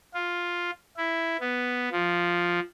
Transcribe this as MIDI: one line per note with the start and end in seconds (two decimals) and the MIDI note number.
0.14 0.70 65
0.97 1.37 64
1.40 1.89 59
1.92 2.60 53